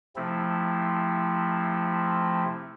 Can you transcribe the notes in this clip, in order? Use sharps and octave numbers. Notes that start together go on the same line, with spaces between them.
C3 F3 A3 C4 E4